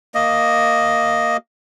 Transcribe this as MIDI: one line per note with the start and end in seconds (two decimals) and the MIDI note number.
0.15 1.37 58
0.15 1.37 75